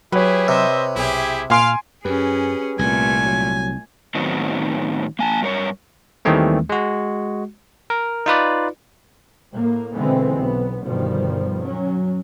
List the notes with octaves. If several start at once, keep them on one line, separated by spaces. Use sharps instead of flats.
F#3 E4 G4 G#4 B4 C#5
C3 C5 D#5 E5
B1 E4 G4 G#4
A#2 F5 G#5 C6 D7
F#2 C#4 G4 G#4 B4
C2 A#2 A3 G#5
F#3
A2 D#3 F#3 B3 C4 D#4
A#3 G#5 A5
G2 A#4 C#5
D#2 D#3 E3 G3 A3 C4
G#3 F#4
A#4
D#4 F4 B4 D5
A2 A#3
B2 D3 E3 G#3 B3 C4
B1 B3
G1 B2 D#3 F3 G3
F#3 C#4